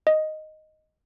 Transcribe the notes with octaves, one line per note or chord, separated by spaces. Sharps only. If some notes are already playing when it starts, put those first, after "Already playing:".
D#5